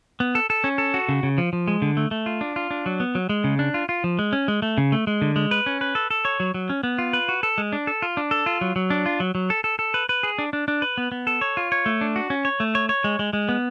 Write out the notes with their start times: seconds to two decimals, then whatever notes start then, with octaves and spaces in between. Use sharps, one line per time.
0.20 B3
0.35 A4
0.50 A4
0.64 C#4
0.78 A4
0.94 F#4
1.09 C#3
1.23 C#3
1.38 F3
1.53 F3
1.68 G#3
1.82 D3
1.97 A3
2.11 A3
2.26 F4
2.41 D4
2.56 F4
2.71 D4
2.86 F#3
3.00 B3
3.15 F#3
3.29 G#3
3.44 C#3
3.59 D4
3.74 F4
3.89 F4
4.04 F3
4.19 G#3
4.33 C#4
4.48 G#3
4.62 A3
4.78 C#3
4.92 A3
5.07 G#3
5.22 D3
5.36 G#3
5.51 B4
5.66 C#4
5.81 B4
5.95 A4
6.10 A4
6.25 C#5
6.40 F#3
6.54 F#3
6.69 C#4
6.83 B3
6.98 F4
7.13 B4
7.29 F#4
7.43 A4
7.58 G#3
7.72 D4
7.87 A4
8.02 F4
8.17 D4
8.31 A4
8.46 F4
8.61 F#3
8.76 F#3
8.90 D4
9.06 F4
9.20 F#3
9.35 F#3
9.50 A4
9.64 A4
9.79 A4
9.94 B4
10.09 B4
10.23 G#4
10.39 D4
10.53 D4
10.68 D4
10.82 B4
10.98 B3
11.12 B3
11.27 A4
11.41 C#5
11.57 F4
11.72 C#5
11.86 A3
12.01 D4
12.16 F#4
12.30 C#4
12.45 C#5
12.60 A3
12.75 C#5
12.89 C#5
13.04 G#3
13.19 G#3
13.33 G#3
13.49 B3